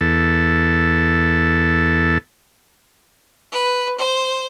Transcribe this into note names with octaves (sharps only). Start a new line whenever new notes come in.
E2 A4
B4
C5